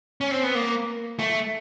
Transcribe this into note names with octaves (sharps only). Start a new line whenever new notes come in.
C#4
C4
B3
A#3
A3